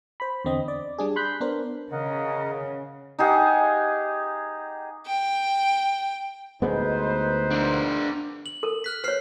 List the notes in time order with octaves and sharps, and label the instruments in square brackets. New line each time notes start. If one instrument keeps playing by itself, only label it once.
[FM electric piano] C5 B5
E2 D3 C4 D#5
D5
G3 D4 G#4
B5 C6 F#6 G6 B6
B3 D4 A#4 C5
[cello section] C#3 [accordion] A#4 D#5 F#5
[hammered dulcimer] D#4 G4 G#4 F#5
[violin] G5
[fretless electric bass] D2 G#3 B3 [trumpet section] D#4 B4 C5
[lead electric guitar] D4 A#4
[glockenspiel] F#7
[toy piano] A4 A#4
[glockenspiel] F6 F#6 B6
[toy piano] B4 C#5 [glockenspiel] F6 C7